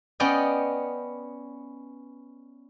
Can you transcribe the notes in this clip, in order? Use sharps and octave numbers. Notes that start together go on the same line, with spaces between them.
B3 C#4 D5 D#5 G5